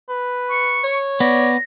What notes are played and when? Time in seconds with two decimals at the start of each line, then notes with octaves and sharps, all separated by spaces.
0.09 B4
0.49 C#6
0.84 C#5
1.20 B3 D5 A#6